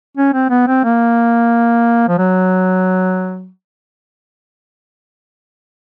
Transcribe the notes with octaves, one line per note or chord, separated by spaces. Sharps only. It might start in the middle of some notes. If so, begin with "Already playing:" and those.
C#4
C4
B3
C4
A#3
F3
F#3